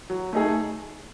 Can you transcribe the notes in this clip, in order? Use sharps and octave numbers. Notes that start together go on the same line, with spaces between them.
F#3
A3 D#4 G#4